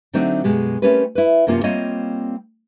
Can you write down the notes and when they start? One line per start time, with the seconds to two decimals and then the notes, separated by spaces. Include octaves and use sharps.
0.13 D3 F#3 A3 C4 D4 D#4
0.44 F#2 B2 G#3 G4
0.82 A3 C4 C#4 G4 A#4 B4
1.15 E4 B4
1.47 F#2 C3 A#3 C#4 F4
1.63 G3 A#3 C4 F4 C#5 D#5